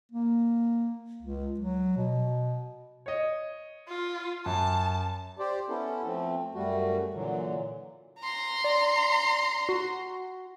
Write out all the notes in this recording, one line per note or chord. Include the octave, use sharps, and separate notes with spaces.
A#3
C#2
F#3
B2
C#5 D#5
F4
F#2 A5
G4 C5 D5
B3 C#4 E4 A4
F3 A3 C4
F#2 G3 A3 F#4
A#2 D3 E3 F#3
A#5 C6
D5
F#4